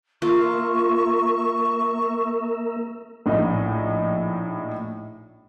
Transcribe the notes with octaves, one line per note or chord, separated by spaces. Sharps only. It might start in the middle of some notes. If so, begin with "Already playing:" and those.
A#3 F4 A#4 E5 C#6
A#1 A2 D#4